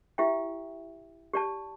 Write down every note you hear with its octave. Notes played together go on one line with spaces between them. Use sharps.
E4 G4 E5 G5
G4 D5 A5